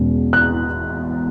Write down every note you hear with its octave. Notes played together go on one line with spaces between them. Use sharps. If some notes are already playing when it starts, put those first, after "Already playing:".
Already playing: E2 B2 G#3 C#4
F#6